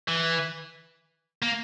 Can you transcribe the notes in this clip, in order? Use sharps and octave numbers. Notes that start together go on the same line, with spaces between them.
E3
A#3